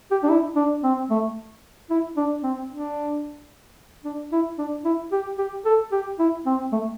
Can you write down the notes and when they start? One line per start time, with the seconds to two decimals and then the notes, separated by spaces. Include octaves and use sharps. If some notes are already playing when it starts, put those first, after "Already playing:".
0.11 G4
0.23 D4
0.30 E4
0.56 D4
0.83 C4
1.10 A3
1.90 E4
2.17 D4
2.43 C4
2.71 D4
4.05 D4
4.32 E4
4.58 D4
4.85 E4
5.12 G4
5.39 G4
5.66 A4
5.92 G4
6.19 E4
6.46 C4
6.72 A3